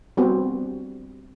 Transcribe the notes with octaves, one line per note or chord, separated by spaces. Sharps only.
G3 B3 C4 F#4 B4